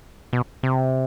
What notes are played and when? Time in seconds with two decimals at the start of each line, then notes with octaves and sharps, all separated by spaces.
0.33 B2
0.63 C3